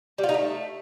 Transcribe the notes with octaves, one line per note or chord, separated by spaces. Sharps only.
G3
F4
D#4
A3